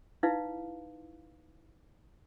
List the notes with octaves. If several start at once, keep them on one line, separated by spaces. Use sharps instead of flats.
D#4 E4 B4 F5